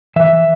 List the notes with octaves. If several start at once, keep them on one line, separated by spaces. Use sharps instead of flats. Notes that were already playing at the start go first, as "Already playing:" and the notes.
E3 E5